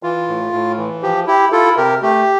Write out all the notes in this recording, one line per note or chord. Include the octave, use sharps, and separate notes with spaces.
E3 F4
A2
A2
E3
F3 G4
E4 G4
E4 F4 A4
C3 G4 A#4
A3 G4